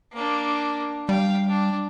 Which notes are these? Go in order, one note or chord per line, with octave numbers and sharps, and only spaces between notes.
A#3 D4
G3 F5 G5
D4